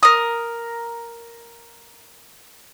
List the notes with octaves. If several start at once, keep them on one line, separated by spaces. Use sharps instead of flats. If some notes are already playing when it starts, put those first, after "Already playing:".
A#4 D#6